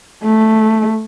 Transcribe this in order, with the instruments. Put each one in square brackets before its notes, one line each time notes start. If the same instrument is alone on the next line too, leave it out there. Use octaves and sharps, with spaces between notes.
[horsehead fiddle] A3